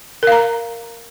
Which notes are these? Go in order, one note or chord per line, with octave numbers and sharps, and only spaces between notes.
A#4 F5 A#5